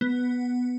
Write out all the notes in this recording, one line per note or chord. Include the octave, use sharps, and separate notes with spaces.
B3